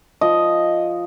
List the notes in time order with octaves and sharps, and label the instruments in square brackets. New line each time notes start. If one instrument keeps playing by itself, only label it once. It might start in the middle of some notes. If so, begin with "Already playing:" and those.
[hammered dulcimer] F3 D#5